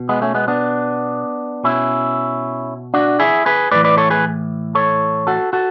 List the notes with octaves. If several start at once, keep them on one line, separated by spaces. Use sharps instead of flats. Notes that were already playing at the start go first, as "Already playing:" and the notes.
Already playing: B2
G#3 B3
A3 C#4
G#3 B3
B3 D4
B2 C#4 E4
D4 F#4
E4 G#4
G#4 B4
A2 E3 B4 D5
B4 D5
A4 C#5
G#4 B4
A4 C#5
F#4 A4
F#4 A4